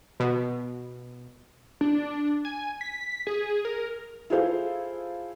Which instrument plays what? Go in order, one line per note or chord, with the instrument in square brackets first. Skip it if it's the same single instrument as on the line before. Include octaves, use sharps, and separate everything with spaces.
[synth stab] B2
[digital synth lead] D4
G#5
B6
G#4
A#4
[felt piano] E4 F4 G#4 A4 C5 F5